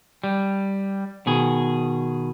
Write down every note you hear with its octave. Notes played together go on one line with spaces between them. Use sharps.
G3
B2 D#3 G#4